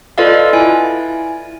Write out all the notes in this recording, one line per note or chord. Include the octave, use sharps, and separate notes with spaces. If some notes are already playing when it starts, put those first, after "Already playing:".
F4 A4 B4 D5 D#5 F5
E4 G#5